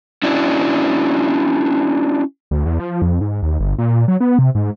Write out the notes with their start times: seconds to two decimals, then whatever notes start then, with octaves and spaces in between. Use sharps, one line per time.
0.23 C#4 D4 E4 F#4
2.51 D2
2.65 E2
2.79 F3
3.02 F2
3.21 G#2
3.42 D#2
3.60 G1
3.78 A#2
4.08 F#3
4.20 B3
4.39 C3
4.55 G#2